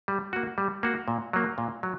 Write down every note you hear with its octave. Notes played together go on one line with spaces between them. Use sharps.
G3
A#3 F#4
G3
A#3 F#4
A#2
F#3 A#3
A#2
F#3